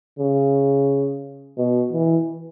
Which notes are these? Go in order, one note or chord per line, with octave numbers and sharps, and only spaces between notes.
C#3
B2
E3